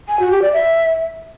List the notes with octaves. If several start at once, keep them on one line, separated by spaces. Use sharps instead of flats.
G#5
F#4
G4
D5
E5